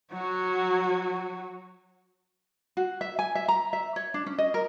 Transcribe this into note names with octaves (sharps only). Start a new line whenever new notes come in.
F#3 F#4
F#4
E5
G#5
E5
A#5
E5
C#5
D4
C#4
D#5
A#4